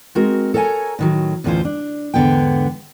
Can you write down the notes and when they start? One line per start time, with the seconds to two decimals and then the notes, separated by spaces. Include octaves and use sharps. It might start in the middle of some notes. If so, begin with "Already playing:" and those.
0.15 G#3 C4 F#4 A#4
0.54 A4 A#4 C#5 F#5 G#5 A#5
0.99 A2 D#3 F#3
1.44 D2 A2 E3 C#4 F4 C5
1.65 D4
2.14 E2 G#2 D3 B3 D4 G5